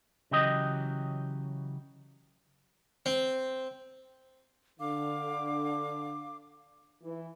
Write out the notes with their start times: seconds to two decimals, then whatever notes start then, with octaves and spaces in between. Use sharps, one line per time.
0.31 C#3 E3 F#3 G4 D#5
3.06 C4
4.80 D3 F5 D6
7.03 E3